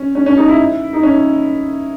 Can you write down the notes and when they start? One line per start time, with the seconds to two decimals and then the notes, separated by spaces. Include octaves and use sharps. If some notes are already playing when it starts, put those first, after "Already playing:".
Already playing: C#4
0.15 C#4
0.26 C#4
0.37 D#4
0.48 E4
0.93 D#4
1.03 C#4